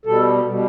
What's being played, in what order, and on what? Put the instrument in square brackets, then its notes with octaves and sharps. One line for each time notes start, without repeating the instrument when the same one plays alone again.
[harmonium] B2 G3 A4
B2 G3